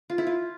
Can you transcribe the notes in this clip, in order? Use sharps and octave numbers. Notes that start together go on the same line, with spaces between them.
F4
E4
F4